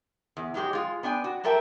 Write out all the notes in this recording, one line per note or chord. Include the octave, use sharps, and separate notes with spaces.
E2
G#2 F#3 G#3 G4 G#4
G#3 F4
B3 D4 G5 G#5
F#4
G3 A3 A4 A#4 E5 G5